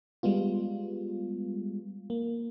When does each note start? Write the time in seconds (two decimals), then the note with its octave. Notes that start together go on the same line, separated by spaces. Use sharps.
0.23 G3 G#3 B3 F4
2.10 A#3